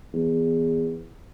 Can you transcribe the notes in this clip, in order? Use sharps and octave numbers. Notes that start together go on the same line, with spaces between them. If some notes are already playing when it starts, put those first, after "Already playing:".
E2